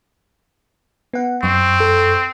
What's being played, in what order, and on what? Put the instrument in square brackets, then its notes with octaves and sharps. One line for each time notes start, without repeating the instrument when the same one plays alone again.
[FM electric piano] B3 F#5
[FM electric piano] F#2 C#6 [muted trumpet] C4
[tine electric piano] A4